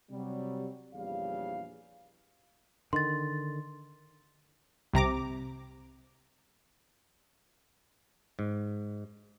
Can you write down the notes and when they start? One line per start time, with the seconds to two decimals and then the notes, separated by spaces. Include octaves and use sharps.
0.10 C3 F#3 G3
0.94 A#1 E2 C#3 E3 G3 F5
2.93 D3 D#3 C6 A6
4.93 C2 C3 A#5 D6
8.39 G#2